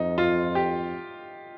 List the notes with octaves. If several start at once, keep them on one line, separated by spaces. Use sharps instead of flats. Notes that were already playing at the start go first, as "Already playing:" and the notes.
Already playing: F2 D#4
F4
G4